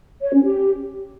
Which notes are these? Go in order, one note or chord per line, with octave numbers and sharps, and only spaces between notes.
C#5
C#4
G4